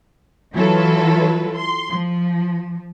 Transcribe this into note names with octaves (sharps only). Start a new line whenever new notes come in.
E3 F#3 E4 F4 A4 B4
C6
F3